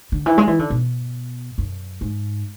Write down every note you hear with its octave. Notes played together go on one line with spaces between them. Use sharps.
D3
E3
G#3
E3
D3
B2
F#2
G#2